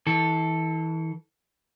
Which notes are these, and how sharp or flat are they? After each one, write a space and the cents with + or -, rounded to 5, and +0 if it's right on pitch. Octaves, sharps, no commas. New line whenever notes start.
E3 -35 A4 +0